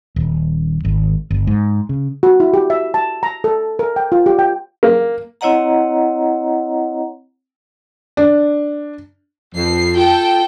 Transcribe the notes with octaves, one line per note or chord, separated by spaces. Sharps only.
D#1
G#1
G1
G#2
C#3
F#4
E4
G4
E5
A5
A#5
A4
A#4
G5
F4
G4
G5
A#3
C4 E4 C#5 D#5 F#5 A#5
D4
F2 C7
F4 A4 G5